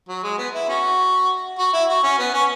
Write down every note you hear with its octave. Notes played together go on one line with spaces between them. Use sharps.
F#3
G#3
B3
E4
C#4 F#4
F#4
E4
F#4
C#4
B3
C#4